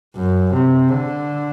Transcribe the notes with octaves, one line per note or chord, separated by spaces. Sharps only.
F#2
C3
D3